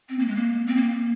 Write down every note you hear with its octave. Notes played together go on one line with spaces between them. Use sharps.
C4
A#3
G#3
A#3
C4
A#3